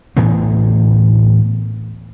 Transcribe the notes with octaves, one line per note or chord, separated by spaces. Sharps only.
D2 A2 E3 B3